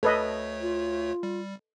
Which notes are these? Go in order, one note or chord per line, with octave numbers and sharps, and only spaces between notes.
D2 A3 A4 B4 C#5 D#5
F4
G3